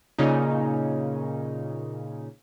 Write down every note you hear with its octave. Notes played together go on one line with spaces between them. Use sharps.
A#2 C#3 C#4 D#4